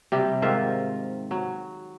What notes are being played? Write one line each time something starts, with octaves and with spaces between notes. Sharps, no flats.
C3 G3 G4
G#2 D#3 F4 E5
F#3